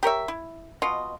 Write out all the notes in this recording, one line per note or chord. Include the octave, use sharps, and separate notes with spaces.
G4 A#4 C#5 E5
E4
B2 F4 D#5